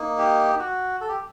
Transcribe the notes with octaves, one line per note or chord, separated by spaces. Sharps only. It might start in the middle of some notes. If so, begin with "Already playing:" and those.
Already playing: A#3 D#4
G4
F#4
A4
G4